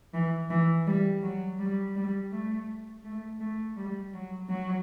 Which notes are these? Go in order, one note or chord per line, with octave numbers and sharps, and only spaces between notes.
E3
E3
G3
F#3
G3
G3
A3
A3
A3
G3
F#3
F#3